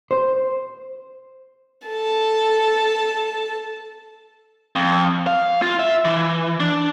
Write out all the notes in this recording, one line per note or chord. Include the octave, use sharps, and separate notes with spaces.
C5
A4 A5
F2
F5
F4
E5
E3
D4